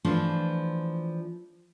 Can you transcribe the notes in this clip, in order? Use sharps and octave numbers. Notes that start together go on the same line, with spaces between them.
E3 F3 A3 D4 F4